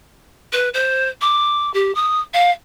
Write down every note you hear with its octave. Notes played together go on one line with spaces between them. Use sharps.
B4
C5
D6
G4
D#6
F5